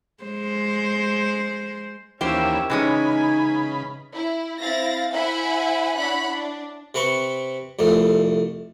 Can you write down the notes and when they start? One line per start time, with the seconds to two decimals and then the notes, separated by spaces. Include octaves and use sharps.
0.24 G#3 C5
2.21 D#2 E3 A#3 C#4 G4 C5 E5
2.70 C#3 E3 G#3 C#4 D#4 G#5 B5
4.15 E4
4.60 C4 E4 F5 A6 A#6
5.12 E4 C5 E5 F#5 G#5 B5
5.94 D4 E4 C#5 F#5 B5 F#6
6.31 D4
6.94 C3 C4 B4 B5 C#6
7.79 C2 F2 A3